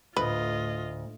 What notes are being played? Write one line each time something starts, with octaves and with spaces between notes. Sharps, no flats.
D2 A2 F4 B4 D#5